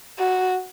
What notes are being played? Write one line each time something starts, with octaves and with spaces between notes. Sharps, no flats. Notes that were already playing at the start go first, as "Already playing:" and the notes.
F#4